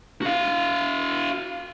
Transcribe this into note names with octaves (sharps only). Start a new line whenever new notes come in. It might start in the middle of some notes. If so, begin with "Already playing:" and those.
F#4 F5